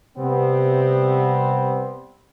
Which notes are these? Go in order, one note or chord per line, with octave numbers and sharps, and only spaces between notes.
C3 G3 B3 C4